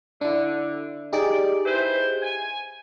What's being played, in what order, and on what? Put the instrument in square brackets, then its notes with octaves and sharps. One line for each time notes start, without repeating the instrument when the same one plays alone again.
[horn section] D3 [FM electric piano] D4 E4
[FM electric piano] D#4 G4 G#4 [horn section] D5
[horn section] E4 B4 C5
G#5